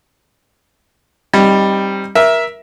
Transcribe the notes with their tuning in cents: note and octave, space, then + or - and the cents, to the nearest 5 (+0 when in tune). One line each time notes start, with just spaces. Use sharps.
G3 +5 C4 +25 D#4 +0
A#4 +20 E5 +0